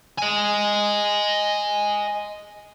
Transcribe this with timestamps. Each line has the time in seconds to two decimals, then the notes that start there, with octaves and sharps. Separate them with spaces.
0.19 D#5 G#5